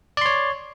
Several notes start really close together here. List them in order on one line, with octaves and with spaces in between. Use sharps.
D5 C6 C#5